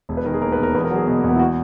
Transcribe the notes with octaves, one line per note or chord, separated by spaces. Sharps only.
E1
B4
D#3 A#4
G#4
D#2 A#4
B4
E1 A#4
E2 B4
A#4
F#3 G#4
B2 B3
A#3
E2 B3
E4
F#4